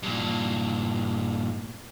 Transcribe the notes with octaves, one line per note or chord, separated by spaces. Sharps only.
G2 A#2